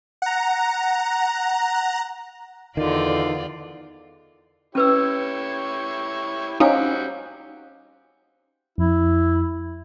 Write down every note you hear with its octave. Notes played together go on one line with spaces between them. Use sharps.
F#5 A#5
E2 D3 D#3 F4 D5
C#4 E4 G4 B4 C#5 E6
G3 C4 C#4 D#4 F#4 F5 G#5
F2 E4